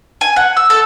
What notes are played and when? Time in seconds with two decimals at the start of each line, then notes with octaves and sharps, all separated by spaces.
0.21 G#5
0.36 F#5
0.57 E6
0.70 A4